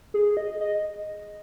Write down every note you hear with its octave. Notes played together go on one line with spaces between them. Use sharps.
G#4
D#5
D#5